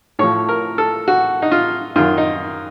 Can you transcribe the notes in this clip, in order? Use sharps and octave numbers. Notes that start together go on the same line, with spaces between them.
A2 F3 C#5
A#4
A4
F#4
D#4
F4
F#2 D#3 F4
D#4